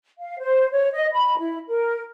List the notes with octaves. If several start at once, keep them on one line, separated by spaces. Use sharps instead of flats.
F5
C5
C#5
D#5
B5
E4
A#4